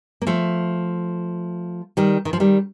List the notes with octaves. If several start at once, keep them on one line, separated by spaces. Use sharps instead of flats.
A#3
F3 A3
D#3 G3
D#3
F3
D#3 G3